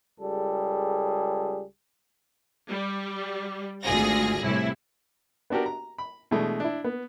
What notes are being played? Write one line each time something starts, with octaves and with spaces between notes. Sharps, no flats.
C#2 G3 G#4 A4
G3
G#1 D2 A3 F4 G#4 A#6
C2 A2 C3 E4
B3 D4 F#4 G4 A#4
A#5
B5
B2 E3 G#3 A3 D4
D4 E4
B3